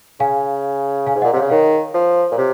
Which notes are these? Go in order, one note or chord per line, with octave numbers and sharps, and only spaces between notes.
C#3 F5 G#5
F5 G#5
G#2
A#2 D#5 F#5
C3 C#5 F5
C#3
D#3 C#5 F5
F3
A#2
C3 C#5